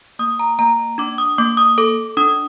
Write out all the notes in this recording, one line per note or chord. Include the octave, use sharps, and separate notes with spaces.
A#3 D#6
A#5
A#3 A#5
D4 D6
D#6
A#3 D6
D#6
A4 D6
D4 D#6